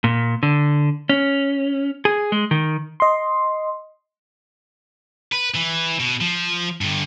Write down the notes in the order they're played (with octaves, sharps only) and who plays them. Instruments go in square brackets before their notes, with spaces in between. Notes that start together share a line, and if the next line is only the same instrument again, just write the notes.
[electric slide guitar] A#2
D3
C#4
G#4
G#3
D#3
[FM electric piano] D#5 C6
[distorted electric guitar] B4
E3
B2
F3
G2 D3